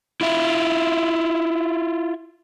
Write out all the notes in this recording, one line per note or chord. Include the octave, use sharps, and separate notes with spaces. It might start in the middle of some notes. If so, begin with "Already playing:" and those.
E4 F4 E5